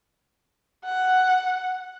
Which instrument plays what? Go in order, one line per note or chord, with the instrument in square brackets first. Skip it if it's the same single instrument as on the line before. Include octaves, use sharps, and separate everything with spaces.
[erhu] F#5